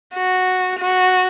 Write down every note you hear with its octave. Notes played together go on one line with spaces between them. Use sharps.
F#4
F#4